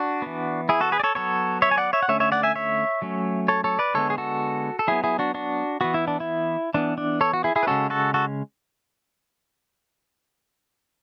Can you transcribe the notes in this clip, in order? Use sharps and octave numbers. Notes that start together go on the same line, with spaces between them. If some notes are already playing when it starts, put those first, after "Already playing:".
Already playing: D4 F#4
E3 B3
E4 G#4
F#4 A4
G#4 B4
D5
A4 C#5
F#3 B3 A4 C#5
C#5 E5
G#5
D5 F#5
C#5 E5
F#5
D3 A3 C#4 C#5 E5
C#5 E5
D5 F#5
E5 G#5
C#5 E5
F#3 A3 C#4
A4 C#5
A4 C#5
B4 D5
D3 G#3 B3 A4 C#5
G#4
F#4 A4
A4
F#3 B3 E4 G#4
E4 G#4
D4 F#4
D4 F#4
E3 B3 F#4
E4
D4
E4
E3 B3 D4
D4
A4 C#5
F#4
E4 G#4
E4 G#4
B4
C#3 G#3 C#4 F#4 A4
F#4 A4
F#4 A4